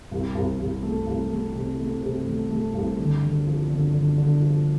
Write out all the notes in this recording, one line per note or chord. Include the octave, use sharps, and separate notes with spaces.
C2
C2
C2
A3
C2
A3
C3
A3
C3
A3
A3
C2
D3
D3
F3
D3
D3
D3
F3